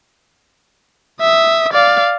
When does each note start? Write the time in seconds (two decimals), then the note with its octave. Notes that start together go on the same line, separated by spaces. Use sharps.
1.21 E5 D#6
1.73 D5 F5